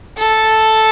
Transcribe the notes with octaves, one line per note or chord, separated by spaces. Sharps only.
A4